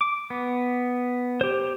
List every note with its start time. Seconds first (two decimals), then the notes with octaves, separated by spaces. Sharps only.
0.01 D6
0.30 B3
1.41 G4 C5